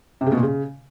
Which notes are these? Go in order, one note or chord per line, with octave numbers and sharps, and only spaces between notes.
C3
C#3
B2
A#2
C#3